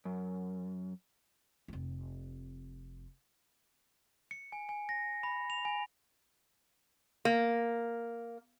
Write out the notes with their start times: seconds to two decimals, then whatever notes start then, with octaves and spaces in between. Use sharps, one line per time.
0.05 F#2
1.68 F1 C4
4.31 C#7
4.52 G#5
4.69 G#5
4.89 A#6
5.23 B5
5.50 F7
5.65 G#5
7.25 A#3